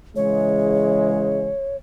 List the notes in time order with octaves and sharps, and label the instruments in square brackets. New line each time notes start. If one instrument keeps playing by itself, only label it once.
[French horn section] C#3 E3 G#3 [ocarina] C#5